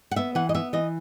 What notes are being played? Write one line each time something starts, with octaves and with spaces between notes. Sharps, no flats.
F#5
B3 E5
E3 F#5
D#5
B3 E5
E3 D#5